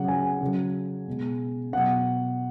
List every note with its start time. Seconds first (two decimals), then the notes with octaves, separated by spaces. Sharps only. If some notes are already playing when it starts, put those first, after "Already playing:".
Already playing: C#3 F#3 F#5
0.08 G#5
0.41 C#3 F#3
1.08 B2 G#3
1.73 B2 F#3 F#5